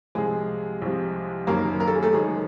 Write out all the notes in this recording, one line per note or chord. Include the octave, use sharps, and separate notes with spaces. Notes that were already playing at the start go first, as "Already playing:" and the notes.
C2 C3 F3 G#3 G#4
C2 C3 F3
F#1 F#2 D#3 F#3 A#3 A#4
A#4
A4
G#4
A3 A4
F#1 F#2 D#3 F#3 G#3 G#4